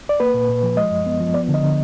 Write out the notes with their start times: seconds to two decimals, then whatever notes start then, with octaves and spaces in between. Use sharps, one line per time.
0.09 D5
0.20 A#3 B4
0.34 A#2
0.49 A#2
0.63 F3
0.77 G#3 D#5
0.91 F#2
1.06 B3
1.20 F3
1.34 B3 D5
1.49 D3
1.54 D#5
1.63 D3